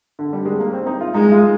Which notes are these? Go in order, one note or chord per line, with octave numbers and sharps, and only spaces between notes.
D3
G3
G#3
A#3
C4
D#4
F4
G#3 D#4
F4